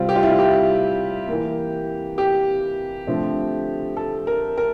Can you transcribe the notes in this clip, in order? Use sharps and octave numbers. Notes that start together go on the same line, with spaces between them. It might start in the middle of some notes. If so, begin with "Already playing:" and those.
Already playing: C3 G3 C4 F4
G4
F4
E4
F4
G4
E3 A#3
G4
D3 F3 A3 C4
A4
A#4
A#4